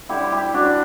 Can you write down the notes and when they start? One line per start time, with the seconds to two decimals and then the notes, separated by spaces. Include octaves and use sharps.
0.09 D3 G3 E4 G4
0.32 E4 G4
0.54 D4 F#4